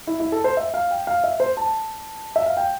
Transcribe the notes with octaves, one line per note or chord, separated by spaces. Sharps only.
E4
E4
A4
C5
E5
F5
G5
F5
E5
C5
A5
E5
F5
G5